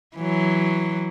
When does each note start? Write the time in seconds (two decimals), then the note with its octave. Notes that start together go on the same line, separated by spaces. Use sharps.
0.17 E3 F#3